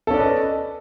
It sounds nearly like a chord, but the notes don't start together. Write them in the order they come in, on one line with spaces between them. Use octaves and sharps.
A4 C#4 D5 B4 D#5